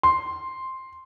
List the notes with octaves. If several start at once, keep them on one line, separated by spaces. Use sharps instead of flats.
C6